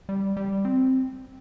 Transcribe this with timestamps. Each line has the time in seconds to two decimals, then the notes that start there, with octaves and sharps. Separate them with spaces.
0.09 G3
0.37 G3
0.65 C4